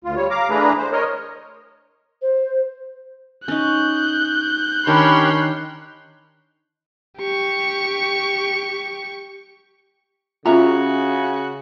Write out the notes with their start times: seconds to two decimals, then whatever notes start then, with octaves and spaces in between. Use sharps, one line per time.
0.04 D2 F4
0.16 G3 C#5
0.30 F5 A#5 D6
0.50 E3 A3 D4 G#4 B4 A#5
0.78 C5
0.92 A#4 C#5 D#5
2.22 C5
3.48 C#4 D#4 F#6 G6
4.87 D#3 C#4 D4 G4 A#4 C#5 B5 C6
7.18 G4 C#6
10.46 C#3 C#4 F4 F#4 E5 A#5